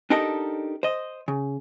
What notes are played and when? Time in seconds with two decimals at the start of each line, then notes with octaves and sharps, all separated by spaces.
0.10 D4 D#4 G4 A4 A#4 D#5
0.83 C5 D#5
1.28 C#3